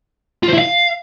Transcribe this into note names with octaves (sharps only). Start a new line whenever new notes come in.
F4
C5
E4
F5